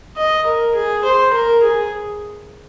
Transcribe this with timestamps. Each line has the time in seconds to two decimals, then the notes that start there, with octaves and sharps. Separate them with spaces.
0.16 D#5
0.46 A#4
0.75 G#4
1.04 C5
1.33 A#4
1.63 G#4